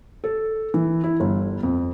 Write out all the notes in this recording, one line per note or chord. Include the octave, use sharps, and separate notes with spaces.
A4
E3
E4
G1
F2